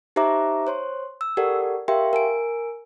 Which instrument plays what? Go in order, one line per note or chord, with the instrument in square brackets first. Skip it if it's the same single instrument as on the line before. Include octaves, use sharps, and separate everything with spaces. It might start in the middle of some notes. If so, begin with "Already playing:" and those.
[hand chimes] D#4 G4 C5 E5 A#5 D6
C5 C#5 C6
E6
G4 A4 A#4 D5 F#5
G4 A#4 E5 F5 G5 C6
A#4 G#5 D7